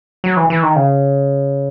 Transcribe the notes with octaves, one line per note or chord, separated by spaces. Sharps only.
F#3
E3
E3
D#3
C#3